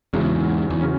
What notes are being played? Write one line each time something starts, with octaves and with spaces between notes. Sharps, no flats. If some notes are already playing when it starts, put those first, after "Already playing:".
E2 G#2 C#3 F#3 C#4
E2
C#3 F#3 C#4